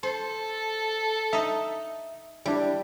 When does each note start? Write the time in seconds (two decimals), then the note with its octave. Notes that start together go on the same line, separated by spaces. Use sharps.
0.03 A4 C5
1.33 D#4 D#5 E5
2.46 G3 D4 E4 G4